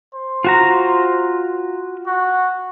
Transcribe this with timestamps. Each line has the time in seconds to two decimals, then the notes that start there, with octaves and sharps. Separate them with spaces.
0.14 C5
0.44 F4 F#4 A#5
2.07 F#4